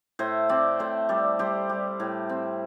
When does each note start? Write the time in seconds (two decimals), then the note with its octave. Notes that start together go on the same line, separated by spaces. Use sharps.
0.19 A2 C5 E5
0.49 C4 D5 G5
0.79 A2 C5 E5
1.09 G3 A4 D5
1.39 G3 G4 C5
1.70 G3
2.00 A2
2.29 C4